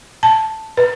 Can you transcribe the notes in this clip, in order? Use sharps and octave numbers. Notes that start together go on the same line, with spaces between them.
A5
B4